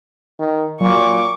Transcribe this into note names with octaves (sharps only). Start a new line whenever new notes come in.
D#3
A#2 F#3 C#6 D6